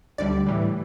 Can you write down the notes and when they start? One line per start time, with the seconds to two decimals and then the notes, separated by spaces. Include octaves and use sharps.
0.18 D2 D3 G3 D5
0.47 A2 E3 G3